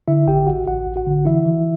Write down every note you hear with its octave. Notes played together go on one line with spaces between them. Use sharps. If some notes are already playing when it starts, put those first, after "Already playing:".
D3 E4 E5
A1 G4 G5
A1 F#4 F#5
A1 F#4 F#5
A1
F#4 F#5
D3
E3 E4 E5
E3